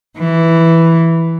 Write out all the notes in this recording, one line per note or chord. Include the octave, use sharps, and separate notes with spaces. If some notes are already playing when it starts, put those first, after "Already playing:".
E3